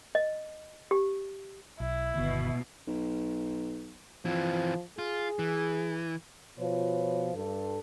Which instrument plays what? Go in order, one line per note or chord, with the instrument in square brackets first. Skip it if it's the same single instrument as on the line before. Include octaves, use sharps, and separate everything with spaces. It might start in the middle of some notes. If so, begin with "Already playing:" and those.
[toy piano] D#5
G4
[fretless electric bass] B1 [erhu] E4
[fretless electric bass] G1 D3 D#3 [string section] B2
[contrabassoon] B1
[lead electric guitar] E3 C4 [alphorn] F3
[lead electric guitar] F4 [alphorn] G#4
[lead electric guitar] E3
[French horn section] B2 F3 F4 B4 C#5
G2 A4